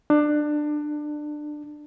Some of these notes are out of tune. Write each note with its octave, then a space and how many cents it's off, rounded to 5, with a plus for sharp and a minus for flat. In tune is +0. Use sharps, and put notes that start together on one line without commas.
D4 +20